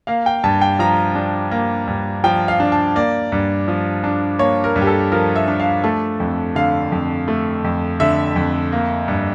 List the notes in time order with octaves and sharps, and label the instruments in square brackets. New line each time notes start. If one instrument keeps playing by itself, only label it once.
[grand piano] A#3 F5
G5
G2 A5
G5
F3 A#5
D4
A#3
G2
F3 G5
F5
D4
A5
A#3 D5
G2
F3
D4
A#3 C#5
A#4
G2
G4
A4
F3 A#4
E5
D4
F5
A3 A5
F2
D3 F5
F2
A3
F2
D3 E5
F2
A#3
G2